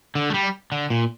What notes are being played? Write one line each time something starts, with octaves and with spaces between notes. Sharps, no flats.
D3
A3
G3
D3
A#2